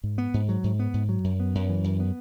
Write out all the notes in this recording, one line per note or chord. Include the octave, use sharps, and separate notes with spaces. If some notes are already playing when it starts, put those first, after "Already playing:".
G#2
B3
G#2
F#3
G#2
B3
G#2
F#3
F#2
B3
F#2
E3
F#2
B3